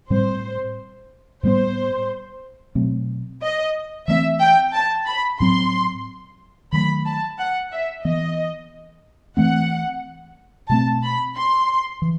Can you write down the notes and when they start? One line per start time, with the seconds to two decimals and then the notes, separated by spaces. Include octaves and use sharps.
0.10 A2 G3 C4 C5
1.43 A2 G3 B3 C5
2.75 B2 F#3 A3 C4
3.42 D#5
4.08 E3 A3 C4 E5
4.40 G5
4.73 A5
5.07 B5
5.40 A2 F#3 C4 C6
6.72 D#3 F#3 A3 B5
7.05 A5
7.38 F#5
7.72 E5
8.04 E3 B3 D#5
9.37 E3 A3 C4 F#5
10.69 B2 A3 C4 A5
11.03 B5
11.36 C6
12.02 E3